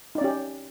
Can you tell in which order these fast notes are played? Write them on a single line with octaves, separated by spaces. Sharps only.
D#4 D5 C#4 G4